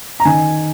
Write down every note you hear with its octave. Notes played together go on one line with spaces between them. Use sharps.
A#5
D#3 G#5